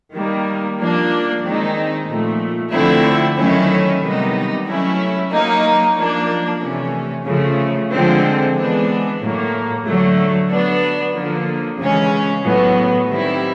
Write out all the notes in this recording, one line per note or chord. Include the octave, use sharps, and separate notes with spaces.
D#3 G3 A#3
F3 A#3 D4
D#3 G#3 C4 D#4
A#2 F3 A3
D3 F3 A3 C4 E4
D#3 F#3 A3 C#4 E4
C3 D#3 G3 B3 D#4
F#3 A3 C#4 E4
F#3 A#3 D#4
F3 A#3 D4
C3 E3 A3 C#4
C#3 F3 A3
D3 F3 G#3 C4
E3 G#3 B3 D4
A2 F#3 A#3
D3 F#3 A3
F#3 B3 D4
D3 F3 A#3
C#3 E3 G#3 C#4
A2 F#3 B3
D#3 G3 C4 E4